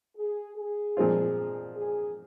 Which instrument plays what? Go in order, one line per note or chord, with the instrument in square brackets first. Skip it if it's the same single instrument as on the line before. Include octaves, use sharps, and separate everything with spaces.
[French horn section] G#4
G#4
[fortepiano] A#2 F3 G#3 C4 F4
[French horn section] G#4